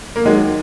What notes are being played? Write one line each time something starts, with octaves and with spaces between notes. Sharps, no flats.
A#3
D#2 D#3 F#3 G#3